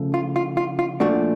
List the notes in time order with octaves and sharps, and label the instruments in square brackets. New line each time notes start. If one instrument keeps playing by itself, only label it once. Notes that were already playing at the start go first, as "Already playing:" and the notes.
Already playing: [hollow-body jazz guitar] C#3 F3 A3
F4
F4
F4
F4
A#2 F3 A3 D4 F#4